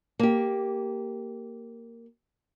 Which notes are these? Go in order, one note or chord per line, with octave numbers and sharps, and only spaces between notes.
A#3 G4